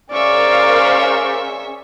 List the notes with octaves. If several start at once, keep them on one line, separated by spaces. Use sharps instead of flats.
C#4 G#4 A#4 C5 D5 E5 F5 C#6